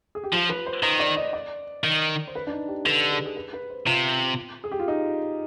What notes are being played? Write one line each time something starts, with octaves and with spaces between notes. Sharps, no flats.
G#4
G4
F3 F4
B4
C5
D#3 C5
D5
D#5
D5
D#3
C5
B4
D4
D#4
G4
D3 B4
G4
G#4
G#4
B4
B4
C5
C3 F4
G#4
G4
F4
D#4